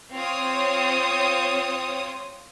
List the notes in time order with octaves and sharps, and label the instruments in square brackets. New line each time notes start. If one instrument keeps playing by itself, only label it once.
[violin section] C4 F4 C5 C#5 D#6